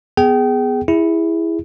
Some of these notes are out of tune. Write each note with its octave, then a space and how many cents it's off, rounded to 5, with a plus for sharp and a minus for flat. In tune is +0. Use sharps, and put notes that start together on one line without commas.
B3 +5 G#4 +0 G5 -30
E4 +0 G#4 -20